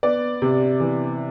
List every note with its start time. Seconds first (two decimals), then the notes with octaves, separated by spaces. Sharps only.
0.03 B3 D5
0.42 C3
0.80 E3